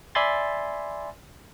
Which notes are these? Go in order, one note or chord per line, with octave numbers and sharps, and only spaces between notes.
D5 E5 G#5 B5 C6 A6